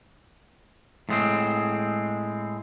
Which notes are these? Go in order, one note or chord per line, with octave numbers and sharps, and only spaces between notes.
A2 G#3 C4